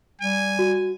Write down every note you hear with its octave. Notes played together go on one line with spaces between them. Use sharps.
G3 G#5
F#4